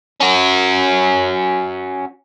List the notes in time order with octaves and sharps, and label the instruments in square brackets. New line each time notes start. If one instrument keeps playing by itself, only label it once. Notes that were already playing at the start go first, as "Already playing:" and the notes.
[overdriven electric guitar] C#4 F#4